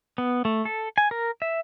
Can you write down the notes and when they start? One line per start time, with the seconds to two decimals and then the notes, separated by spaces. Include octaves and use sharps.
0.18 B3
0.45 A3
0.65 A4
0.98 G#5
1.11 A#4
1.42 E5